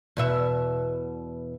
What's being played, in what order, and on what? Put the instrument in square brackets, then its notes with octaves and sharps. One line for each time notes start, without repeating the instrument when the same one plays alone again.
[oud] E2 B2 E5